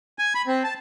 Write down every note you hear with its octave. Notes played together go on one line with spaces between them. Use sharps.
G#5
B5
C4
A5